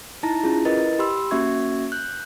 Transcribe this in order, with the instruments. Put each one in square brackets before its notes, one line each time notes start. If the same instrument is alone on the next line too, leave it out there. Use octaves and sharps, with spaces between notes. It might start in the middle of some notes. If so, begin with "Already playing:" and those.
[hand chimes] D#4 E4 A5 A#5 A#6
C#4 E4 F4 G#4
E4 A#4 B4 D#5 A6
G4 B5 C6 E6
A#3 C#4 F#4 E5 C#6 G#6
F#6 G6